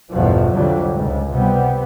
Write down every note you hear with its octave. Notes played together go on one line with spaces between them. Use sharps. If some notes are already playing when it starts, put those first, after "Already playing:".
A1 E2 G2 B2 F3
C2 F2 D3 F#3 G3
C#2 G#2
C3 G3 B3